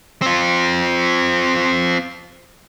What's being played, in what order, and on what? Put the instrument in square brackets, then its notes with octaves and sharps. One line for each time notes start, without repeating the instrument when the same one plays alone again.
[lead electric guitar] C4 F4